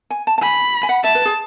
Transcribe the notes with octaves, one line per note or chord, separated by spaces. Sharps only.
G#5
A5
A5
G#5 B5
G#5
F#5
E5 A5
B4
G#4